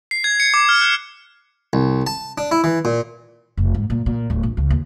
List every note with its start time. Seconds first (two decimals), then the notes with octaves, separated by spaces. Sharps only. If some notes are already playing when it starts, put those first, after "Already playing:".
0.11 C7
0.24 G#6
0.40 C#7
0.54 D6
0.69 F6
0.81 F#6
1.73 C2
2.07 A5
2.38 D4
2.51 E4
2.64 E3
2.85 A#2
3.57 F1
3.75 G#2
3.90 A#2
4.06 A#2
4.30 D1
4.43 A#1
4.57 C#2
4.70 D#2